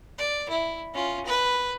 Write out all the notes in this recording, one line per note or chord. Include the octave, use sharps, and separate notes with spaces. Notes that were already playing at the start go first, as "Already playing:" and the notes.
D5
E4
C#4 F4
B4